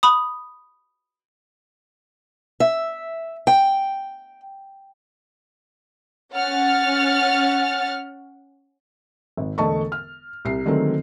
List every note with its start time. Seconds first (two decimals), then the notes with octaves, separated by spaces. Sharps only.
0.03 B5 D#6
2.60 E5
3.47 G5
6.34 C#4 F#5 F6 A6
9.37 G#1
9.58 E1 D3 A3 D#5 A5 C#6
9.92 F6
10.45 C2 C7
10.66 D3 D#3 F#3 G#3 A3 C4